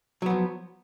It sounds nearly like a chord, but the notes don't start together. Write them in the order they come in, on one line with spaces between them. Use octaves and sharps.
F#3 B3 F3